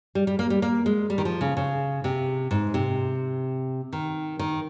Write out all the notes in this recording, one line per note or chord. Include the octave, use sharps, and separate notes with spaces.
G3
G3
A#3
G3
A#3
G#3
G3
D#3
F3
C#3
C#3
C3
G#2
C3
D#3
D#3